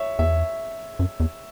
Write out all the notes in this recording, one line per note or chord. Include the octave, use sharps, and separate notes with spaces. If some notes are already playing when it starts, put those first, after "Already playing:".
Already playing: C#5 E5
E2 E5
F#2
E2